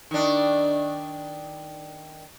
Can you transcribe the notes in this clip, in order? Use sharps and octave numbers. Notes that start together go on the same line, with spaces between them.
D#3 D4